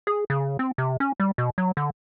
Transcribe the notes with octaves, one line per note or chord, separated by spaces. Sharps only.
G#4
C#3
C4
C3
C#4
G3
B2
F#3
D3